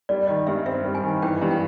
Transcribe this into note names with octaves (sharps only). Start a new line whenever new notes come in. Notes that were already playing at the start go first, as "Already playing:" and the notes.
G3 D5
D#3 D#5
G2 E5
C4 E5
G3
G#5
D#3
E3 G5
G2
G5